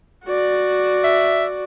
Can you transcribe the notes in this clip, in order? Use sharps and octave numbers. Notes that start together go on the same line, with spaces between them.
F#4 D5
E5